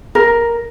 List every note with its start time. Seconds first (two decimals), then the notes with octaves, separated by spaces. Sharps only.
0.15 A#4